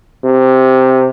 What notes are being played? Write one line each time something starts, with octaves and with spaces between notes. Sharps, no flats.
C3